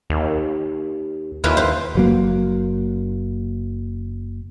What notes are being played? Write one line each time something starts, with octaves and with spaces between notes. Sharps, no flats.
D#2
D#2 E4 F4 B4
B4 C5
F#1 F#3 A#3